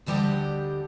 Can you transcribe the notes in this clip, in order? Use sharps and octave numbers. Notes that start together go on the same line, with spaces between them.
D2 D3 G3 G4 D#5 F#5